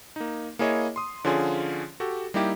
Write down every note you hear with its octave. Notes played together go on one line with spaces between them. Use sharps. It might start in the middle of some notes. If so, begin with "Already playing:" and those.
A#3 D#4
A#3 E4 G#4 C#5 D#5
C6 D#6
D3 F3 C#4 F4 G#4
F#4 G4 A4
G3 A#3 D#4 E4 G4